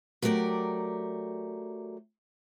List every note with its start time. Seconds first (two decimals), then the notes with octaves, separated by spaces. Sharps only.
0.22 F#3 A3 G4 A#4 D5